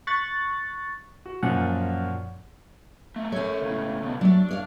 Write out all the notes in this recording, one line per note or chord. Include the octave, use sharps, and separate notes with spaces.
C#6 F#6 A6 B6
F#4
F#2 A#2 F3 F#5
A3 A#3
A3 C#4 A#4 C#5
C#2 A2
C#2 B2
F#3 A3 D4
C#5 D5 F5